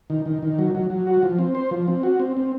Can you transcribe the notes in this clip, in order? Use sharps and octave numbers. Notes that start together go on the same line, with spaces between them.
D#3
D#3
D#3
F#3
F#3
F#3
F#4
F3
C4
C5
F3
C4
F#4
C4
C4